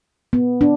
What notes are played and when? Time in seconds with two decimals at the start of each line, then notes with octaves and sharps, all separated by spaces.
0.33 B3
0.61 D4